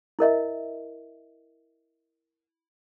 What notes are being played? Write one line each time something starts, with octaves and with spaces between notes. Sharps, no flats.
E4 A#4 D#5 E5